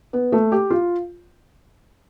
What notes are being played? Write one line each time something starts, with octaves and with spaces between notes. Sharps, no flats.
B3
A3
G4
F4